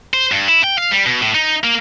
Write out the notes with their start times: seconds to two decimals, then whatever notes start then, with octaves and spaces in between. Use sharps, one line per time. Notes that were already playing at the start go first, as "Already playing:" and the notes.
0.14 C5
0.32 G2
0.48 E4
0.64 G5
0.78 F5
0.91 G3
1.06 B2
1.21 A2
1.35 D#4
1.64 A#3